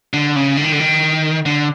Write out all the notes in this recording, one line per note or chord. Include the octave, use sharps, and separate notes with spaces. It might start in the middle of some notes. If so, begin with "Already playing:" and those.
D3
C#3
D3
D#3
D3
D#3
D3